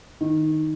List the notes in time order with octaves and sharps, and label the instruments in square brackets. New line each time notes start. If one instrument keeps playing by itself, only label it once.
[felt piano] D#3